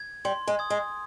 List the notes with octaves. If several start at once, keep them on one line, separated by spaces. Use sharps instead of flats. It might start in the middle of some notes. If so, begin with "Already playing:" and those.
Already playing: G#6
G3 C6
G#3
D#6 G#6
G#3